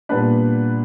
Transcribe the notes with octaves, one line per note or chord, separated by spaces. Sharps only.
A#2 G3 B3 D4 B4